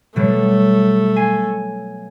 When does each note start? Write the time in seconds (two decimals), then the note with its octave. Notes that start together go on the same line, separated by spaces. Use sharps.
0.16 B2 F#3 G3 A3
1.16 G#5 C7 D#7